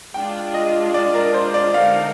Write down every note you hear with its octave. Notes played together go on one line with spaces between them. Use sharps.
G#3 D4 F4 G5
D#5
D5
A#4
C5
D5
D3 G#3 D#4 A#4 F5